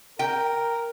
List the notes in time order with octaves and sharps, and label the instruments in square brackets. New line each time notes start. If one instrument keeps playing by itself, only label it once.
[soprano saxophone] A#4 [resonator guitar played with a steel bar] G5